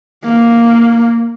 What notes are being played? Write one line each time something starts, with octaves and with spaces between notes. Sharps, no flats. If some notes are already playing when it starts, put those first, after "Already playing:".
A#3